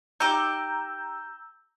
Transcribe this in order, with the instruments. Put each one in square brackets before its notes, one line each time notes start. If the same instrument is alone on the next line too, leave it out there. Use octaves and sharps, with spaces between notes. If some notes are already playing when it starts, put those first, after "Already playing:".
[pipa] D#4 G4 [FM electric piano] A#5 E6 G6